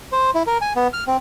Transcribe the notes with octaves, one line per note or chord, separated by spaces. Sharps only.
C5
E4
A#4
G#5
B3
F6
C4